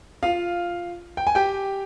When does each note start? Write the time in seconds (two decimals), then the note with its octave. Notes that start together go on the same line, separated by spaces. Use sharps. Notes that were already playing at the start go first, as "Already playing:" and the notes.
0.23 F4 F5
1.17 G5
1.27 G#5
1.35 G4 G5